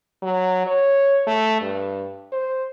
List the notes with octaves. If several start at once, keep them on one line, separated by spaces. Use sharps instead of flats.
F#3
C#5
A3
G2
C5